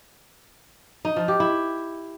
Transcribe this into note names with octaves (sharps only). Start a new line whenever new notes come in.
D#4
F3
G4
E4